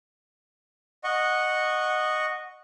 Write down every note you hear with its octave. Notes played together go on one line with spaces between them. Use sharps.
D#5 F#5 C#6